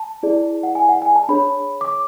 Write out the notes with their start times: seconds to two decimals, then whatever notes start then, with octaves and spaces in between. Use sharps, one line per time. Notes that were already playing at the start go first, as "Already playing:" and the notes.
Already playing: A5
0.23 E4 G#4 D5
0.63 F#5
0.75 G#5
0.89 F#5
1.02 G#5
1.16 A5
1.29 D4 G#4 C#5 B5
1.81 D6